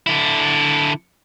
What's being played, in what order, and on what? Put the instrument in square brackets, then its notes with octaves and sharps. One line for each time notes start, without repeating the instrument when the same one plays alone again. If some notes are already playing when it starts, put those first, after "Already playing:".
[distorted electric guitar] D3 E4